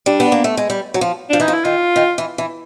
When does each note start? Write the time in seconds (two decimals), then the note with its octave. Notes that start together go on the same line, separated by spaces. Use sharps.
0.06 G3 D4
0.20 B3
0.32 A#3
0.44 A3
0.57 G#3
0.70 G3
0.94 F#3
1.01 F3
1.30 F3 D4
1.40 E3 D#4
1.48 F3
1.54 E4
1.65 D#3 F4
1.96 D#3
2.18 E3
2.38 E3